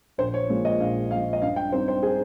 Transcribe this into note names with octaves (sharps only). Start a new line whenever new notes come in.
A#1 C5
C#5
A#2 F3 G#3
D#5
A#1 F5
A#2 F3 G#3 F5
D#5
G2 F5
G5
G3 C4 D#4 C5
C5
G#4